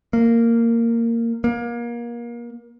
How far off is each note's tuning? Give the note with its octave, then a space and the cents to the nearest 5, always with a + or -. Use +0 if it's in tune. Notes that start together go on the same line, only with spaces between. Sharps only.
A#3 -10
A#3 +30